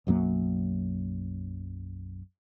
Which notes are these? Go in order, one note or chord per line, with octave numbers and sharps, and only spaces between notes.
B1 F#2 F#3 A#3